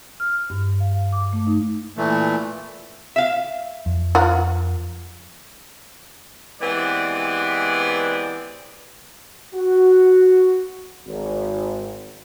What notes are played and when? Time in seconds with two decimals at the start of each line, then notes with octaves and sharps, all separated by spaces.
0.20 F6
0.50 G2
0.80 F5
1.13 D6
1.33 A3
1.47 D#4
1.97 A#2 E3 A3
3.16 E5 F5
3.86 F2
4.15 F4 A#4 F#5
6.61 E3 G#3 B3 C4 G4 D5
9.55 F#4
11.07 G#1